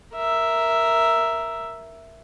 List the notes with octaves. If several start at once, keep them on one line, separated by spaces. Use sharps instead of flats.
A#4 E5